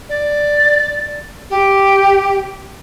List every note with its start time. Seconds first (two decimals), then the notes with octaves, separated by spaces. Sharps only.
0.09 D5
1.50 G4